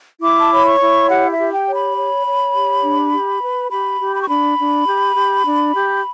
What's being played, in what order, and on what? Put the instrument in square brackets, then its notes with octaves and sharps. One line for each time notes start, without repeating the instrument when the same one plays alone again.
[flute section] E4 D6
A5
C#5 B5
C#6
E4
G4 F#5
E5
G4
G5
C#5
B5
C#5
C#5
G4
D4
G4
B4
G4 B5
G4
B5
C#6
D4 B5
D4
G4
G4
D4
G4